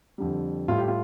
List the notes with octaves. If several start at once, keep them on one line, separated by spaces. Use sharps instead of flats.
F2 D3 G3
A2 G3 F4
G4
F4